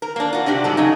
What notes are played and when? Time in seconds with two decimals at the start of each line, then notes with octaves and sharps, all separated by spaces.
0.02 A#4
0.16 A#3 D4
0.33 F4 F#4
0.46 C3 D4 F#4 G4
0.64 G#2 G3 A4
0.77 C#3 F#3 D#4